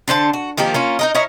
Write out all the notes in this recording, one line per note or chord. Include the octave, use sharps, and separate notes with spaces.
D3 D4 C5 A5
F#4
D#3 F3 A#3 G4
A#3 C#4 F4
D#4 A#4 D#5
D#4 E4 A#4 C#5